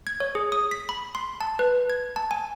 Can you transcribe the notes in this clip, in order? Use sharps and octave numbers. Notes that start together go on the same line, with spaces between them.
G#6
C#5
G#4
D#6
B6
B5
C6
A5
B4
G#6
A5
G#5